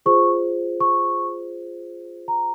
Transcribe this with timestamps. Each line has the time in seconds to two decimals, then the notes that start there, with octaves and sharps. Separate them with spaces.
0.06 F4 G#4 C5 C#6
0.80 C#6
2.28 A#5